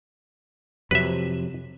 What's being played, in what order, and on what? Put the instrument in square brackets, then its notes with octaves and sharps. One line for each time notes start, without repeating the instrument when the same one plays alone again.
[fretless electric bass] F2 C3 F#3 [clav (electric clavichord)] B4 E5